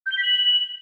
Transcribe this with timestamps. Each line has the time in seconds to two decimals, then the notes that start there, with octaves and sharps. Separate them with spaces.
0.06 G6
0.12 G7
0.17 B6
0.23 F#7